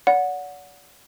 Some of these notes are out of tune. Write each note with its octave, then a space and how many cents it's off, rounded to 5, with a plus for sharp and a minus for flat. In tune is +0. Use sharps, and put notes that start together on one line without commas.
D5 -45 F#5 -15